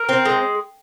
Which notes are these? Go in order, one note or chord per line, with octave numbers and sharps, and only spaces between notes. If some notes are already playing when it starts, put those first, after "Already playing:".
Already playing: A#4
C4
G#3